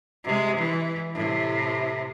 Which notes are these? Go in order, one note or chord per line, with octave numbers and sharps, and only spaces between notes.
C3 G#3
E3
A2 C3